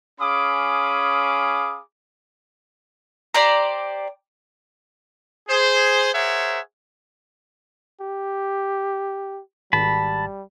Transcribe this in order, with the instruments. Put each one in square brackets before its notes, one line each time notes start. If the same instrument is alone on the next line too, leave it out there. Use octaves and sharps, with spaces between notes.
[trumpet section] C#4 G#4 F5 B5 D6 D#6
[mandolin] G4 C5 D5 A#5
[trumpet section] G#4 C5
G#4 A#4 C5 C#5 E5 F#5
[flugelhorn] G4
[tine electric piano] G#1 [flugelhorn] G3 [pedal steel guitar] A5 B5